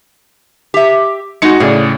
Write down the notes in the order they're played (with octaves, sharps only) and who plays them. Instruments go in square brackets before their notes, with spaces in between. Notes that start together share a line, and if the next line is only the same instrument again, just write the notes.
[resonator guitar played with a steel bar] G4 E5
[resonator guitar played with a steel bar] G#3 D#4 [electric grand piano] F#4 C#7
[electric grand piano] A2 C#3 D5 [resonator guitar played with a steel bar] G#4